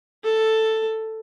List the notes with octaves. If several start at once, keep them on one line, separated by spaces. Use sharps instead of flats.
A4